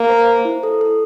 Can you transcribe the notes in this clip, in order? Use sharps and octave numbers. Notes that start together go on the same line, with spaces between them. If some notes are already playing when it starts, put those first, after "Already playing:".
Already playing: A#3
C5
C5
E4
A4
A4